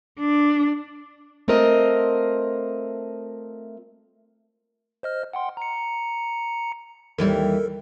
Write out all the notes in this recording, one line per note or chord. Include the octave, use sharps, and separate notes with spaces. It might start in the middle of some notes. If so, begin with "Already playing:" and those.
D4
A3 C4 F4 A#4 D#5
C5 D#5 F6
F#5 G5 C6
A#5 C#7
D#2 E3 G3 A4 A#4